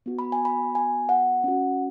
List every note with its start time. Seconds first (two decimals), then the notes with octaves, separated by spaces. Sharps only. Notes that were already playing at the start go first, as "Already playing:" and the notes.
0.06 B3 F#4
0.19 B5
0.32 G#5
0.45 B5
0.75 G#5
1.09 F#5
1.44 C#4 F#4